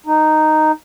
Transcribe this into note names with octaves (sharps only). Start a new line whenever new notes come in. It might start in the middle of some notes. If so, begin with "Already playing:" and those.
D#4